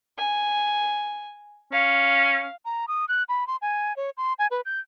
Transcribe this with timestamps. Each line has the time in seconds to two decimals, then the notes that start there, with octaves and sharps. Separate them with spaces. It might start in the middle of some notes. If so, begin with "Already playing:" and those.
0.18 G#5
1.73 C#4 F5
2.65 A#5
2.88 D#6
3.08 F#6
3.29 B5
3.47 C6
3.62 G#5
3.97 C#5
4.17 C6
4.39 G#5
4.51 B4
4.66 G6